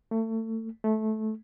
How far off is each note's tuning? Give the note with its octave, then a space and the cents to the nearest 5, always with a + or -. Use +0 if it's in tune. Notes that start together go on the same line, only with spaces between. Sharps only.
A3 +30
A3 -15